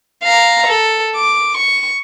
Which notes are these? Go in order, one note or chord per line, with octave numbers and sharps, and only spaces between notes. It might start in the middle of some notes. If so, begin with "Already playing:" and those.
F5 A#5
A4
D6
C#6